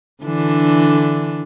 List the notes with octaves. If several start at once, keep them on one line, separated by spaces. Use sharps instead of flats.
D3 E3 D4